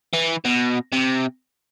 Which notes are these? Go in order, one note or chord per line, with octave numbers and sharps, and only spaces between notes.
E3
B2
C3